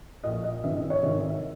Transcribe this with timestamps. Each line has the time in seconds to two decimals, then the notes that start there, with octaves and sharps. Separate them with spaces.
0.24 A#1 A#2 D#5
0.44 D#5
0.64 G#1 G2 E3 E5
0.77 D#5
0.90 C#5
1.03 G#1 G#2 D#3 E5
1.30 E5